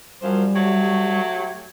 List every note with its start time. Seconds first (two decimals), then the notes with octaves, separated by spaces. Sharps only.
0.21 F#2 F3 G3 C5
0.55 F#3 A3 G4